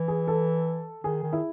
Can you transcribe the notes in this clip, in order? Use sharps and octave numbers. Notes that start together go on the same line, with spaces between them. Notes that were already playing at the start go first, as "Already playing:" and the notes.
Already playing: E3
G#4
A4
D#3 G#4
D#3
E4